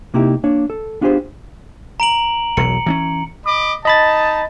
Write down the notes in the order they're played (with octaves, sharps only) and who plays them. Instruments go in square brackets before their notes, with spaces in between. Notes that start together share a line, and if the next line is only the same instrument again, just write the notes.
[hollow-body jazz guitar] C3 A#3 D#4 E4 G4
A#3 D4 C#5
A4
B3 D4 F4 G4 G#4 C5
[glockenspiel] A#5 D7 F#7
[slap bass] E1 B1 F#3 [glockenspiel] C#7
[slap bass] E3 C4 C#4
[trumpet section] D#5 B5 D6
[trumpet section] D#4 A5 [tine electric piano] D#5 B5 A6